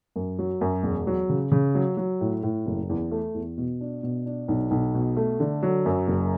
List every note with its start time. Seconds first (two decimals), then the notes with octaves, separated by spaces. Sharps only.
0.16 F#2
0.39 F#3
0.61 F#2
0.83 E1
1.07 F#3
1.29 C#3
1.52 C#3
1.75 F#3
1.97 F#3
2.21 A2
2.43 A2
2.66 F#1
2.89 E2
3.11 A3
3.34 E2
3.58 B2
3.81 D4
4.03 B2
4.26 D4
4.48 B1
4.71 B1
4.94 B2
5.17 A3
5.40 D3
5.63 F#3
5.86 F#2
6.08 F#1